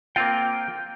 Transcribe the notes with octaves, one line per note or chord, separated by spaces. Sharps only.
A#3 C4 F4 G5